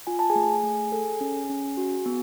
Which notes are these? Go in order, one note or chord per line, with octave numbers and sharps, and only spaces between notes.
F4 G#5
A5
G#4 G#5
A3
A3
A4
C#4
C#4
F#4
B3